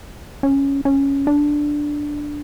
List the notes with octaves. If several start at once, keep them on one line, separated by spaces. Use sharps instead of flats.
C#4
C#4
D4